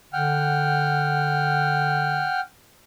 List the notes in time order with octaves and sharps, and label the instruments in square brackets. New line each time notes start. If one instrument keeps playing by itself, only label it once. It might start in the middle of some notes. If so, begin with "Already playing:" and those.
[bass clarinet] D3 [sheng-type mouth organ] F#5 G5 F6